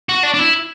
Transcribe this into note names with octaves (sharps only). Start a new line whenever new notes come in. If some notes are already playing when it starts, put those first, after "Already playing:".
F#4
D4
D4
E4